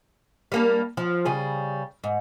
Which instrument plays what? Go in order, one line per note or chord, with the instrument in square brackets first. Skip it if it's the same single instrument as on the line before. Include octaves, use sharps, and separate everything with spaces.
[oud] G3 A#3 D4
F3
C#3 G3 G#4
G#2